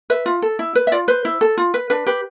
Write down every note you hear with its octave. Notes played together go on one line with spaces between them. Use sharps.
B4 E5
F4
A4
E4
B4
E5
F4 D5
B4 C5
E4
A4
F4
B4
D4 B4
G4 B4